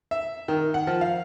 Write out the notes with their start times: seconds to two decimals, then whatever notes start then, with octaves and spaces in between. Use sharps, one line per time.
0.11 E5
0.48 D#3
0.74 F#5
0.87 F3
1.01 F5